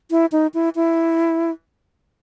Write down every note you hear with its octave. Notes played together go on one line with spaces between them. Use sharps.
E4
D#4
E4
E4